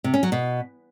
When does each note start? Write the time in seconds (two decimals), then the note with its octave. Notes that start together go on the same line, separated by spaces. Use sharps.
0.04 C3
0.14 C#4
0.23 F#3
0.32 B2